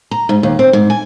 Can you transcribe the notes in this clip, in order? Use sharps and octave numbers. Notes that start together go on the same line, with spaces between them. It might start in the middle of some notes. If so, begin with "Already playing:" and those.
A#5
G#2
D#2
C4
G#2
G#5